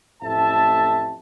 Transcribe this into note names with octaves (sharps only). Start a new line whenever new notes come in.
A1 F2 A2 E5 A5